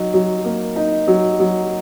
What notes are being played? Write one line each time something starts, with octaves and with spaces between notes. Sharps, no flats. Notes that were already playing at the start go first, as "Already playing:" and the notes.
Already playing: F#3 D#4
F#3
A#3
D#4
F#3
F#3